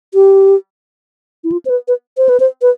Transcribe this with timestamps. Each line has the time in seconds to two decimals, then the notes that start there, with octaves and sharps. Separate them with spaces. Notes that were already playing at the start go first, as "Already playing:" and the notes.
0.14 G4
1.44 E4
1.52 F4
1.65 C5
1.70 B4
1.88 B4
2.17 C5
2.29 B4
2.40 C5
2.62 B4